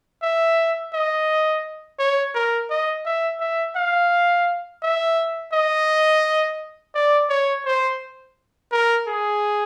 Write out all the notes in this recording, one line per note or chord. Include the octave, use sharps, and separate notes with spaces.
E5
D#5
C#5
A#4
D#5
E5
E5
F5
E5
D#5
D5
C#5
C5
A#4
G#4